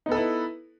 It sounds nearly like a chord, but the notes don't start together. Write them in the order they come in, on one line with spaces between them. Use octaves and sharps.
D#4 B3 A4 B4 E4